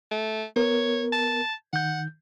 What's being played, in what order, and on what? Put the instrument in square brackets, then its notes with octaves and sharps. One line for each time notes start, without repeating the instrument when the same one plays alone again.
[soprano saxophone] A3
[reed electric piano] B3 A#4 [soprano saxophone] C#5
[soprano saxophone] A5
[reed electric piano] D#3 G6 [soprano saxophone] F#5